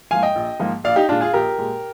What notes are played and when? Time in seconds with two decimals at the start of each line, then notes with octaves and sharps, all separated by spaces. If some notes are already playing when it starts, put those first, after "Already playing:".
0.11 G#2 F3 A#3 F5 G#5
0.22 D#5 G5
0.35 A#1
0.60 G#2 F3 A#3
0.84 A#1 D5 F5
0.96 D#4 G4
1.09 A#2 G#3 D4 F4
1.21 F4 G#4
1.33 A#1 G4 A#4
1.58 A#2 G#3